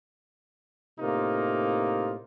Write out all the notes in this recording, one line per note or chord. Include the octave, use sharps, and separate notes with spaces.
A2 C3 A#3 D#4 F4